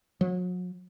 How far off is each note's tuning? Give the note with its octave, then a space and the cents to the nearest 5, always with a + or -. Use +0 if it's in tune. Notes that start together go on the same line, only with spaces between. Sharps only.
F#3 -40